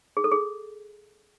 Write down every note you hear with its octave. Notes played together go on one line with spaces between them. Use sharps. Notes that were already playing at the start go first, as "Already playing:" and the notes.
G#4
A4
G#4